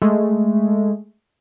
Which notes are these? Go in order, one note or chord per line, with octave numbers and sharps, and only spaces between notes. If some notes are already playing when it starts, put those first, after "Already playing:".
G#3 A3